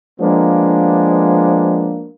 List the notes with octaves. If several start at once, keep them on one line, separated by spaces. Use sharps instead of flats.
F3 G#3 A#3 B3 D4